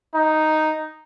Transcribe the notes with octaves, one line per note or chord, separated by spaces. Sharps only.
D#4